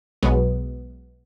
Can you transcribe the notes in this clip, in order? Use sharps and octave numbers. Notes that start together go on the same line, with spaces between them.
B1 F#3 G#3 B3